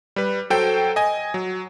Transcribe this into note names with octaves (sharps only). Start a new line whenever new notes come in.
G3 B4
F#3 A4 C5 G5
D#5 G#5
F#3